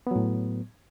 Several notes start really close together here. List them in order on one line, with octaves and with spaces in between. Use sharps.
B3 F#3 A2